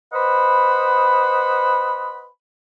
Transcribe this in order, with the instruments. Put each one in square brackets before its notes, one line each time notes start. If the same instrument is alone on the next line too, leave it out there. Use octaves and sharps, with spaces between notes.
[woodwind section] B4 C5 D#5 F#5 B5